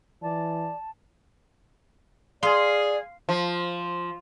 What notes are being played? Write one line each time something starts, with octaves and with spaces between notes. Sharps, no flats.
E3 D5 A5
G#4 D5 F5 C6
F3